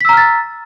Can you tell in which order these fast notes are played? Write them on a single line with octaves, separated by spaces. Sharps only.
B6 E6 A#5 F6 A6